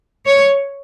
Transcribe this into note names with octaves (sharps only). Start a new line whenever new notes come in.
C#5